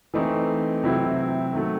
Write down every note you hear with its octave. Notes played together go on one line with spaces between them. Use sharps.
E3 A3 C4 D#4
C3 F#3 C4 E4
D#3 F#3 A3